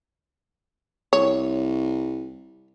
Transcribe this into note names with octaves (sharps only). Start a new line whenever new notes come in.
C2 C#5